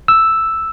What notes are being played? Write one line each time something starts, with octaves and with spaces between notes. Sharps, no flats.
E6